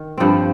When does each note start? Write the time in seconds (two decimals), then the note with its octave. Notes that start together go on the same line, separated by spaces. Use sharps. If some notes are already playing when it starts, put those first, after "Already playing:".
Already playing: D#3
0.18 G2 F3 C4